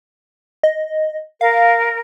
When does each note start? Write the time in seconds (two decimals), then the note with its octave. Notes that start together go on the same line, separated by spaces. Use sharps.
0.63 D#5
1.41 A#4 F5